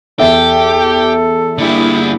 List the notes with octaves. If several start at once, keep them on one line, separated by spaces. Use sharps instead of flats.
E2 G4 A4 E5
D3 G3 A#3 E4 G#4